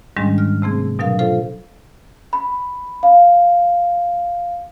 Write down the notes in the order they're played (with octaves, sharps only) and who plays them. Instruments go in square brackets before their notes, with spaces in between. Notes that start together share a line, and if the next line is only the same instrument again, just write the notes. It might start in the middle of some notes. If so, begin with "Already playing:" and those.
[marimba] G#2 D#3 G3 G#3 C#4 D4
F6
C3 A3 C4 G#4
B2 F#3 D4 A#4 F5
F4 A4 C5 F5
[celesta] B5
F5